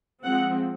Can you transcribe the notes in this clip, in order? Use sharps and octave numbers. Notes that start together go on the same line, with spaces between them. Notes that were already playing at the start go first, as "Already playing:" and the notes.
F3 G#3 C4 F#5